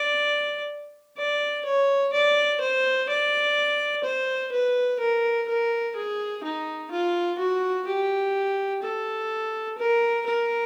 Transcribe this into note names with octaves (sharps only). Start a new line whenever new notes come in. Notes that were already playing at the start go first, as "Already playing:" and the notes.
Already playing: D5
D5
C#5
D5
C5
D5
C5
B4
A#4
A#4
G#4
D#4
F4
F#4
G4
A4
A#4
A#4